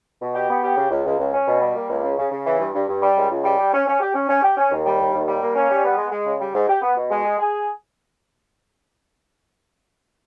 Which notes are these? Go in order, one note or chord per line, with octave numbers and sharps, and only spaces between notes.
B2
G4
B3
G4
C#3
C#2
C#2
C#2
C#4
B2
G3
A#3
C#2
C#3
C#3
C#3
E3
G2
G2
G2
G3
C#2
C#2
G3
G4
C#4
C#4
G4
C#4
C#4
G4
C#4
D#2
G3
D#2
D#2
G3
A#3
C#4
G3
B3
G#3
G#3
C#3
G3
G#2
G4
B3
B2
G#3
G#4
G#4